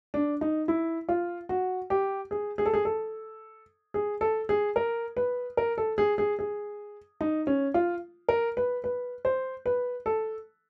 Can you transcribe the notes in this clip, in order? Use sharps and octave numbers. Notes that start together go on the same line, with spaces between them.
D4
D#4
E4
F4
F#4
G4
G#4
G#4
A4
G#4
A4
G#4
A4
G#4
A#4
B4
A#4
A4
G#4
G#4
G#4
D#4
C#4
F4
A#4
B4
B4
C5
B4
A4